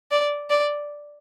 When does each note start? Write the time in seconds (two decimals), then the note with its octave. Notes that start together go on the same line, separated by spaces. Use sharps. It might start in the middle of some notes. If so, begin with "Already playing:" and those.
0.11 D5
0.50 D5